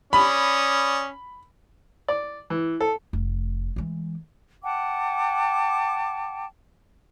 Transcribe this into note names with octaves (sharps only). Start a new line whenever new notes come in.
C#4 D5 B5 D#6
D5
E3
A4
F1
E3 G#3
F#5 G5 A5 D6